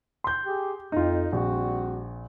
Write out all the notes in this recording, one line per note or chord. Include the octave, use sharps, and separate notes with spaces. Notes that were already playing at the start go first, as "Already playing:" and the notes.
C6 G6
G4 G#4
F2 D#4 F4
A#1 G3 C4 F#4